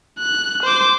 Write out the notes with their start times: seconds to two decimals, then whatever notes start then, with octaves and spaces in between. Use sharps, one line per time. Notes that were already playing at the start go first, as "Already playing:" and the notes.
0.19 F#6
0.63 C5 D6